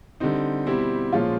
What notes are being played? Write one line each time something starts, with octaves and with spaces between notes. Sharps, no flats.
D3 G3 C4 D#4
B2 G3 C4 E4 G4
A#2 F3 G#3 C#4 F4